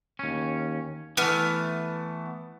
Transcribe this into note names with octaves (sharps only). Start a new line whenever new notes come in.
D#2 C#4
E3 A3 B3 F6